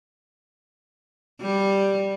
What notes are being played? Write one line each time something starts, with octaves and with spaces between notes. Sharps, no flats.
G3